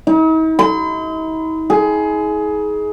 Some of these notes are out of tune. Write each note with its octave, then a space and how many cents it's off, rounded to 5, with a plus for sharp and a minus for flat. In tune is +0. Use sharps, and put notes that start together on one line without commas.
D#4 +45
C6 -45
G#4 +20